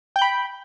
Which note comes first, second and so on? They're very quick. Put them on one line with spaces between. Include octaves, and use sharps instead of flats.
G5 G6 B5